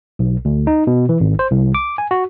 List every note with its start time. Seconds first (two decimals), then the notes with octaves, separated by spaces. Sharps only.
0.19 B1
0.45 D2
0.67 D#4
0.87 B2
1.09 E3
1.20 G#1
1.39 C5
1.51 C2
1.75 D6
1.98 G#5
2.11 F#4